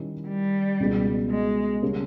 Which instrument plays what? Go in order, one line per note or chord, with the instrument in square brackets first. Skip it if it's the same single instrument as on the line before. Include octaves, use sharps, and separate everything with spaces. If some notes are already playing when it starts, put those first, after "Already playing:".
Already playing: [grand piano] D#3 G3 C#4 E4
[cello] G3
[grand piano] C#2 B2 G#3
[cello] G#3
[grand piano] C#3 G3 A#3 C#4